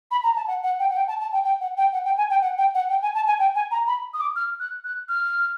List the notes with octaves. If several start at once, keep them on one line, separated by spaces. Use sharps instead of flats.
B5
A#5
A5
F#5
F#5
G5
F#5
G5
A5
A5
G5
G5
F#5
G5
F#5
G5
G#5
G5
F#5
G5
F#5
G5
G#5
A5
G#5
G5
G#5
A#5
B5
D#6
D6
F6
F#6
F#6
F6